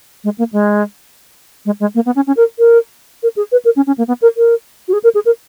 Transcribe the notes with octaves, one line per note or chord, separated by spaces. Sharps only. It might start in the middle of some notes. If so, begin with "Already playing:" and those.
G#3
A#3
G#3
G#3
G#3
A#3
B3
C#4
C#4
A#4
A#4
A#4
G#4
B4
A#4
C#4
C#4
A#3
B3
A#4
A#4
F#4
G#4
A#4
G#4
A#4